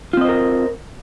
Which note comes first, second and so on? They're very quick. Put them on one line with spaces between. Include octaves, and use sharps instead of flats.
F4 C4 D#5 C5 A#4